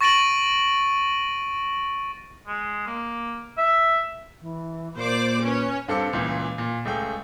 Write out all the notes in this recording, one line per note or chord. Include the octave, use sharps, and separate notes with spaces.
C#6 A6 A#6 D7 D#7 F#7
G#3
A#3
E5
E3
A#2 A#3 C5 D5 D6
C#4 B4 C#5
G2 C4 A4 F5 D6 C#7
C#2 A#2 E3
A#2
C#2 A3 G#4 G5